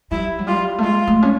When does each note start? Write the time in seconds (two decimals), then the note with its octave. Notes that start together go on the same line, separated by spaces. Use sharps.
0.11 G3 E4
0.38 F#3
0.47 G3 F4
0.78 A3
0.83 G#3 F4
1.07 A3
1.22 C#4